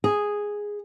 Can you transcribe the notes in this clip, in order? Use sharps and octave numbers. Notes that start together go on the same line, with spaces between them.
G#4